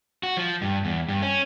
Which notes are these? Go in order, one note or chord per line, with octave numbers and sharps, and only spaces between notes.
F#4
F3
G2
E2
G2
C#4